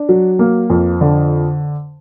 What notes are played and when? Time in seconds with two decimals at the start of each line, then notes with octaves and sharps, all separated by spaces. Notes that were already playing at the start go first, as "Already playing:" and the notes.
Already playing: D4
0.09 F#3
0.39 A#3
0.70 F2
1.01 D3